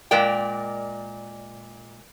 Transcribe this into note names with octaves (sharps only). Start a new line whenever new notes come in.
A#2 G#3 A#4 D5 G5